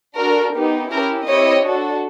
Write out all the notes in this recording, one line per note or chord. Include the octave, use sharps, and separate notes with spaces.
D4 F#4 A4 A#4
B3 D#4 G4
C#4 E4 G4 A#4
C4 E4 G4 C#5 D#5
D4 F#4 A4